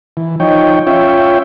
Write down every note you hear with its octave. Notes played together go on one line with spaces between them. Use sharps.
E3
F3 D#4 C#5 G5
C#4 F4 C#5 E5 G5